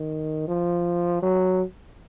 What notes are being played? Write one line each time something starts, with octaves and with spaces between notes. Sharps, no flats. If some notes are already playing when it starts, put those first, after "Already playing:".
Already playing: D#3
F3
F#3